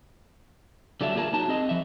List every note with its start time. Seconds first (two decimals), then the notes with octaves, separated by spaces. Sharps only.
1.01 D3 F#3 G3 D4 A4 E5
1.16 A#3 F4 G#4 A#4 A5
1.33 F#3 D#4 A5
1.48 C4 G#4 D#5
1.69 F3 E5